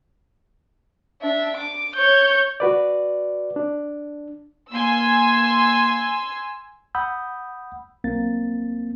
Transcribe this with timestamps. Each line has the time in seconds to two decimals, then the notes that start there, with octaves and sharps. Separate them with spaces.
1.21 D4 E5
1.57 D6
1.96 C#5 G6
2.60 F#4 B4 D5
3.56 D4
4.72 A#3 G#5 C6 E6
6.95 F#5 B5 D#6 E6 G6
8.04 B1 A#3 C4 A6